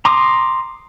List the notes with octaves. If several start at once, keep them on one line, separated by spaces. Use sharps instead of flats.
A#5 C6 D6 D#6